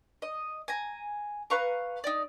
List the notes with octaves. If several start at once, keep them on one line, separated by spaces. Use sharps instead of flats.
D#5
G#5 A#5
B4 F5 A#5 C#6
D#4 D5